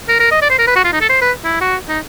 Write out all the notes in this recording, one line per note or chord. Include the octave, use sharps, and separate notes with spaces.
A#4
A#4
D#5
D5
C5
A#4
B4
F#4
F4
D#4
A4
C5
B4
E4
F#4
D#4